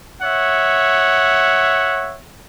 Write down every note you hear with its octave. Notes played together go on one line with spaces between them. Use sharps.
C#5 E5 F#5